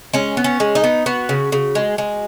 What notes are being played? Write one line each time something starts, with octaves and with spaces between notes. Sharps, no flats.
G#3 C#4
B3
C#4
G#3
D#4
B3
B3 F#4
C#3
C#3
G#3
G#3